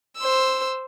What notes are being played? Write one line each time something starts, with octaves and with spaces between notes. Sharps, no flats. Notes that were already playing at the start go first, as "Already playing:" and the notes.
C5 E6